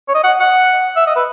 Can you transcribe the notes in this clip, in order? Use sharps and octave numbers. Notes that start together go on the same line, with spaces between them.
C#5
D#5
F#5
F#5
E5
D#5
B4